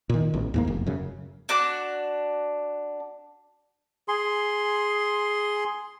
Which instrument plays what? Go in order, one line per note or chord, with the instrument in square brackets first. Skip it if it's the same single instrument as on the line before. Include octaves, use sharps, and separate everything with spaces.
[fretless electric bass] A#2 D#3
A1
D#2 G#2 A#3
F1
F#2 C#3
[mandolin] D4 F#4 D6 F#6
[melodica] G#4 C6